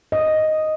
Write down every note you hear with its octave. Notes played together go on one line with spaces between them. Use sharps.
D#5